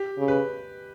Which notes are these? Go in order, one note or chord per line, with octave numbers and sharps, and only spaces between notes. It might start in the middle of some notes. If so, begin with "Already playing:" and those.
Already playing: G4
C#3
B4